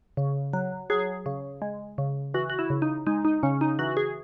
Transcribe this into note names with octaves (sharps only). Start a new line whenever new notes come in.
C#3
F#3
F#3 G#4
C#3
G#3
C#3
E3 F#4
F#4
E4
C#3
D#4
G#3 D#4
D#4
C#3 C#4
D#4
E3 F#4
G#4